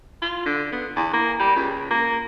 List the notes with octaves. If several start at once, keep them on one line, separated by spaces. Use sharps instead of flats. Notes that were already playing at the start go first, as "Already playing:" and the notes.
F4
D3
B3
E2
A#3
G3
C#2
A#3